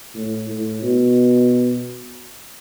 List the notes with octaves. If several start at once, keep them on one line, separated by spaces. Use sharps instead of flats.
A2
A2
B2